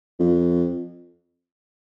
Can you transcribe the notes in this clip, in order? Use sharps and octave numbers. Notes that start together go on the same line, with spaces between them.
F2